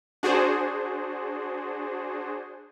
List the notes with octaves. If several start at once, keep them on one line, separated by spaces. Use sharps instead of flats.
D4 F#4 G#4 C5